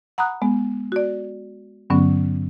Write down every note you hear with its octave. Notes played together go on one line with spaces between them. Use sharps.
F#5 A#5 B5 D#6 F#6
G#3 B3
F#4 D5
G2 D3 F#3 B3 C#4